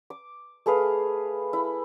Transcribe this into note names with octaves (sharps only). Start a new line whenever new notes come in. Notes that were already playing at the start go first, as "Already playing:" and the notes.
D6
A3 G#4 B4 F5
E4